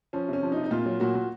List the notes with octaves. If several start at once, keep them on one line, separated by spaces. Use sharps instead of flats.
F3 C#4
C3 C#4
F3
D#4
C3
D#4
A#2 F4
F#3
A#2 F#4
A#2